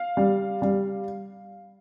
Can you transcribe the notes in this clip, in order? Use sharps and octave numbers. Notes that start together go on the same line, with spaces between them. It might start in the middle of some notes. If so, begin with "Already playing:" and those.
Already playing: F5
G3
G3